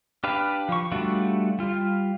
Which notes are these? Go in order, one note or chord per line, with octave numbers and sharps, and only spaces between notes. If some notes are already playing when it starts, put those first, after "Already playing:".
D4 G4 B4 F5
F3 C#6
G3 A3 D4 F4 F#4
G3 F4